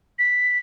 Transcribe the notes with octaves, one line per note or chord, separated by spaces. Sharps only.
B6